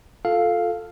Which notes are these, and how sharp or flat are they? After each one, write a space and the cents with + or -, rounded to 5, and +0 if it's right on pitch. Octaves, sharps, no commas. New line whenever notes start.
F4 +20 A4 +0 F5 +0